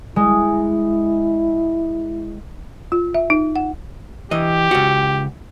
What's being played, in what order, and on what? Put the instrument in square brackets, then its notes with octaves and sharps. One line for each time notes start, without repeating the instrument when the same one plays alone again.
[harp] G#3 [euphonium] E4
[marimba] F4
E5
D#4
F#5
[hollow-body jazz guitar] E3 D#5 [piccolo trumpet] G4
[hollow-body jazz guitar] C#2 F#4